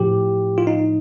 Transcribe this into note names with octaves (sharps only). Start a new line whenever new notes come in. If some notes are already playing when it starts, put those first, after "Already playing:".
Already playing: A2 F3 G4
F4
D#4